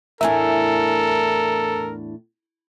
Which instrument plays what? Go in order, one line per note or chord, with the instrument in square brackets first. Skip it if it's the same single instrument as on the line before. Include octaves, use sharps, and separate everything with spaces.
[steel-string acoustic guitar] E2 A2 D4 [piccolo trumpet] A4 [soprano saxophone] A#4 [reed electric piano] E5 G#5